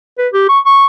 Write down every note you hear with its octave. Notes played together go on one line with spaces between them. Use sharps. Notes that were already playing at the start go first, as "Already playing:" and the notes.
B4
G4
C#6
C#6